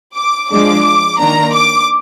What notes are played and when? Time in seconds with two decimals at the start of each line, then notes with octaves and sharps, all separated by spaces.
0.17 D6
0.51 F3 G#3 D4 D6
1.19 D#3 A#3 D4 A#5
1.53 D6